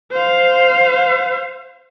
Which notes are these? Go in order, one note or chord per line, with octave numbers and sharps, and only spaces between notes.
C5 F5